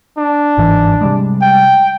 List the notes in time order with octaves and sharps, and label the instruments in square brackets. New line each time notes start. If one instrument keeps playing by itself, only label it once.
[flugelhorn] D4
[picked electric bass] G1 G#2 E3
C3 G3 G#3
[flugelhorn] G5